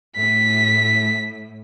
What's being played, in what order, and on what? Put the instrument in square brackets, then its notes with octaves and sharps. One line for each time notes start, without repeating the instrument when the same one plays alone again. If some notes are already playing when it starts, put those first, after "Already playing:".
[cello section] A2 [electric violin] B6